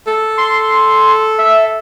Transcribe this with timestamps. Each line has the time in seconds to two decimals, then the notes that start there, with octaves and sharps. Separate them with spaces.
0.07 A4
0.38 C6
1.38 E5